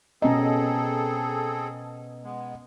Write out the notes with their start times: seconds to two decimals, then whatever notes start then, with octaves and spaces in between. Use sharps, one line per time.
0.22 B2 C4 C#4 G#4 A4 D#5 A#5
2.24 G#3 B3